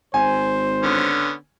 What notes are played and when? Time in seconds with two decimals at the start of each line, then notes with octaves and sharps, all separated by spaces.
0.14 G#1 C5 G#5
0.83 D3 B3 C#4